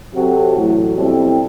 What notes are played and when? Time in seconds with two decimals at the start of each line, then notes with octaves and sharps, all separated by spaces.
0.13 C3 F#3 C4 F#4 A4
0.55 A1 A2 F#3
0.96 B2 G3 C4 E4 A4